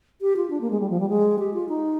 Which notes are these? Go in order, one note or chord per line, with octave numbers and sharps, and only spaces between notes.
G4
F4
D4
A#3
G#3
G3
F3
G3
G#3
G4
F4
D#4